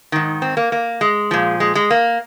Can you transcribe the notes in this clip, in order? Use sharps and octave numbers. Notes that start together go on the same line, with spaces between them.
G#2 D#3
C4
A#3
A#3
G#3
A#2 F3
G#3
G#3
A#3